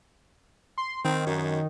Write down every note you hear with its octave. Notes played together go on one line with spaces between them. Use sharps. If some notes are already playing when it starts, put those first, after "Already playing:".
C6
D#3 C4
F#2